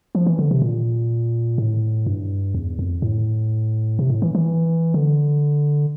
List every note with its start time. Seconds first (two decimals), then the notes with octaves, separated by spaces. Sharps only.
0.15 F3
0.27 E3
0.39 D3
0.51 C3
0.62 A#2
1.58 A2
2.07 G2
2.55 E2
2.79 F2
3.02 A2
3.99 C3
4.10 A2
4.22 E3
4.35 E3
4.94 D3